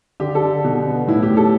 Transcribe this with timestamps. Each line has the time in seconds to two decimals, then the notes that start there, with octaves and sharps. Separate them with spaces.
0.20 D3 G4
0.35 A4
0.42 D3
0.64 B2
0.86 B3
1.07 A2 E4
1.23 G4
1.31 A2
1.37 A4